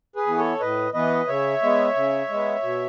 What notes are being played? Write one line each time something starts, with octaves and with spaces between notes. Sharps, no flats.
G#4 B4
E3 B3
A4 C#5
A2 B4 D#5
E3 B3 B4 D#5
C#3 C#5 E5
G#3 B3
C#3
G#3
B3
B2